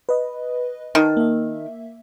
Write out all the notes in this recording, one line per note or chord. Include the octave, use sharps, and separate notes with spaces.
B4 D#5
D#3 A#4 A5
A#3 E5